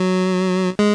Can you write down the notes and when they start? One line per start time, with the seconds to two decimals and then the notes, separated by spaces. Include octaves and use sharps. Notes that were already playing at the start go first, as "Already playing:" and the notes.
Already playing: F#3
0.79 G#3